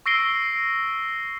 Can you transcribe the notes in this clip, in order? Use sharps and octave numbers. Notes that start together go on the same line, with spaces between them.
C#6 E6 A#6 C7 D7 G7